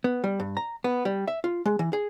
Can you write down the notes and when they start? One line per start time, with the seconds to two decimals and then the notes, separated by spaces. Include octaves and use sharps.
0.04 B3
0.24 G3
0.40 G2
0.57 A#5
0.84 B3
1.05 G3
1.28 E5
1.44 F4
1.66 G#3
1.79 E3
1.93 G#4